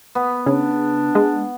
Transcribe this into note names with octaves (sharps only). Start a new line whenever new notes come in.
B3
C#3 D4
G#3